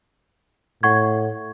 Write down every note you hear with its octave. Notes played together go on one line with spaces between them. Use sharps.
A2 F#5 C#6 G#6